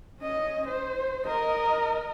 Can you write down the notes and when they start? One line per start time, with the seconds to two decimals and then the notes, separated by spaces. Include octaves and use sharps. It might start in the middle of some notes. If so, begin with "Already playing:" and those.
0.20 C#4 D#5
0.68 C5
1.27 A#4 D#5